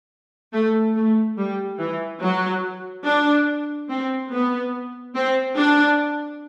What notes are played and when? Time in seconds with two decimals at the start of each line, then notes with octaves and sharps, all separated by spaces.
0.53 A3
0.95 A3
1.37 G3
1.79 E3
2.21 F#3
3.05 D4
3.89 C4
4.32 B3
5.15 C4
5.57 D4